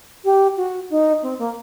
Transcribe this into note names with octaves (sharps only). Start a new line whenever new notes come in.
G4
F#4
D#4
C4
A#3